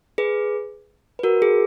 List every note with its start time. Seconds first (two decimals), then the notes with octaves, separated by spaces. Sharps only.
0.18 G#4 B4
1.19 B4
1.23 F#4 A#4
1.42 G#4